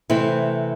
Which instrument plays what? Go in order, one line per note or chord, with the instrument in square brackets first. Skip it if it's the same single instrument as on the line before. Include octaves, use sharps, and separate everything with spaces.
[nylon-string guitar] C3 E3 A3 C4 E4